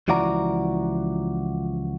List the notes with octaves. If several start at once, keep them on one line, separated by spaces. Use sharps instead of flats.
C#2 E3 F3 F#4 D5 A#5